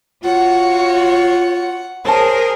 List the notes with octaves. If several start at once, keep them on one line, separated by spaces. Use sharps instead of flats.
F4 F#4 C#5 F#5
G#4 A#4 C5 C#5 A5